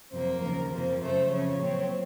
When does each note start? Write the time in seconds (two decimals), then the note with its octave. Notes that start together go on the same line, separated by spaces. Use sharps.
0.11 F2 C3 F#3 A#3 C5
0.41 D#2 C#3 F3 A#4
0.71 F2 C3 F3 A#3 C5
1.01 F#2 C#3 A3 C5
1.31 F2 C#3 F3 C#5
1.60 A#2 F#3 C4